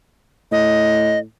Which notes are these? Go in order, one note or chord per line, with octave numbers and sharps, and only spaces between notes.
A2 D#5